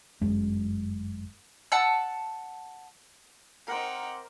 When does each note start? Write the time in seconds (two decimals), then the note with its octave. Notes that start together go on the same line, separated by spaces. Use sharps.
0.21 G1 F#2 G#3 C#4
1.72 F#5 A5 E6
3.68 C4 D#4 A#4 C5 F#5 G5 A#5 D6